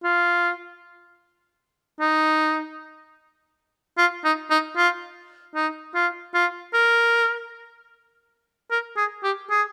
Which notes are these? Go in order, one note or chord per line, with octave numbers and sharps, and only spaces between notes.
F4
D#4
F4
D#4
D#4
F4
D#4
F4
F4
A#4
A#4
G#4
G4
G#4